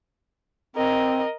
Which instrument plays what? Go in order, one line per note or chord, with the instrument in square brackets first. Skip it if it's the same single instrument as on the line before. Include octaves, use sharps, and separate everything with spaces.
[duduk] C4 [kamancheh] A#4 D#5